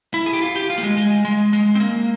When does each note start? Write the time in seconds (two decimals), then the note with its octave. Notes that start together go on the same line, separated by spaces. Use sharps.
0.14 E4
0.26 G#4
0.33 G4
0.42 F4
0.56 G4
0.70 F4
0.78 A#3
0.83 G#3
0.97 G#3
1.25 G#3
1.53 G#3
1.75 C4
1.80 A#3